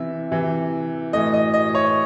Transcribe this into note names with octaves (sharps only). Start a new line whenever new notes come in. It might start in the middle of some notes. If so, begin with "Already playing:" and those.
Already playing: C3 E3 E5
C3 E3
A2 E3 D#5
D#5
D#5
C#5